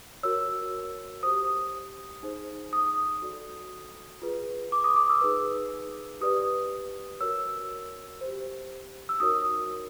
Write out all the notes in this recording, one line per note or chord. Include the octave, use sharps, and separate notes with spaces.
F#4 A#4 C#5 E6
G4 C5 D#6
D#4 G#4 C5
D#6
F#4 A4 D5
F4 G#4 B4
D6
D#6
D6
E6
D#4 G#4 B4
G4 B4 D5 D#6
F#4 A#4 C#5 E6
G4 C5
E6
D#4 F#4 A#4 C#5 D#6